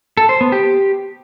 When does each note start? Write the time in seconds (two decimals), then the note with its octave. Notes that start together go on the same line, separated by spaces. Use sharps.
0.17 A4
0.29 C5
0.41 B3
0.52 G4